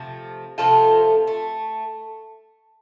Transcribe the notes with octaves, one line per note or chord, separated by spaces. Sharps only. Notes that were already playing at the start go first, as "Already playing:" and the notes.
Already playing: C3 F3 A3
C3 F3 A3 F4 A4
A3